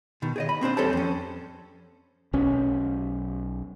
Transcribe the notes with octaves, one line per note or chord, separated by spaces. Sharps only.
B2 D#3
G#4 D5 D#5
B5
A#3 C4 D4 C5
E2 G3 A4 C5 C#5 A5
F2 C#4
B1 C#4